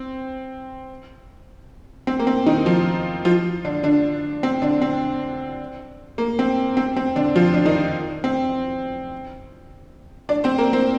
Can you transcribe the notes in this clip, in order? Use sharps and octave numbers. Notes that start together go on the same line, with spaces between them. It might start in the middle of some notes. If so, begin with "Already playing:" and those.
Already playing: C4
C4
A#3
C4
D#3 D#4
F3 F4
F3 F4
D3 D4
D3 D4
C4
D3 D4
C4
A#3
C4
C4
C4
D3 D4
F3 F4
D4
D#3 D#4
C4
D4 D5
C4 C5
A#3 A#4
C4 C5